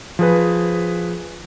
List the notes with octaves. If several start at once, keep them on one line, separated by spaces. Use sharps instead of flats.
F3 G#4 B4